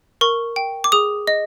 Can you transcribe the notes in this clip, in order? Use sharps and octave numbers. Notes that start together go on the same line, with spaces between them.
A#4 C#6
G5
D6
G#4 D#6
D#5